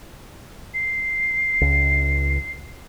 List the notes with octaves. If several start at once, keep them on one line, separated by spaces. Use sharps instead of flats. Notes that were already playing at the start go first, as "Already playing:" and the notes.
C7
C#2